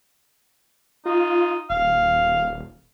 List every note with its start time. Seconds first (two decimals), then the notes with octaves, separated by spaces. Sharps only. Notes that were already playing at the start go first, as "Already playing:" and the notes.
1.06 D#4 F4
1.70 D#1 F5